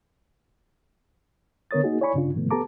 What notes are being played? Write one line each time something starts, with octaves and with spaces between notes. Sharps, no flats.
D3 B3 A#4 C#5 D#6 A6
A#3 D#4 F#4 G#4
E4 C#5 D5 G#5 B5 C#6
G2 C#3 D4 F4
G#2 C3 D#3 F3 A3 B3
B3 G4 A4 A5 A#5 D6